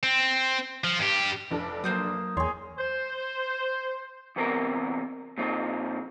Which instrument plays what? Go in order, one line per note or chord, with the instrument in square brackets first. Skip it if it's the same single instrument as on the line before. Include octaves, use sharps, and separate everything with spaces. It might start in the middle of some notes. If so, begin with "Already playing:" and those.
[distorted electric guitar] C4
F3
G2 G4
[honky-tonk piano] F1 D4 A4
[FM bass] F#3 [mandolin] A#3 C5 D#6
[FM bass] E2 [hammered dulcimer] G#4 C6 [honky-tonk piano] C#5
[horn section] C5
[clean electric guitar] E2 C3 B3 C4 E4 A#4
A#2 F3 C4 D#4